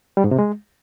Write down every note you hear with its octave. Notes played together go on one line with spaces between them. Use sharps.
G3
G#2
C3
G#3